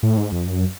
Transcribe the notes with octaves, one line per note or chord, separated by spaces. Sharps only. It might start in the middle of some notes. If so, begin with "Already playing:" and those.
A2
G#2
F2
F#2